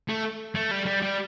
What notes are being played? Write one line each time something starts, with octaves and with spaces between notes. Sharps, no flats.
A3
A3
G3
G3
G3